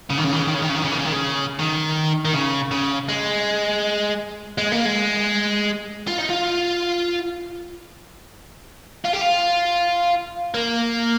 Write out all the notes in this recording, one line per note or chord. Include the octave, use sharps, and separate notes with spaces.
C#3
D#3
C#3
D#3
C#3
D#3
C#3
D#3
C#3
D#3
C#3
D#3
C#3
D#3
C#3
D#3
D#3
C#3
C#3
G#3
G#3
A#3
G#3
F4
D#4
F4
F4
G4
F4
A#3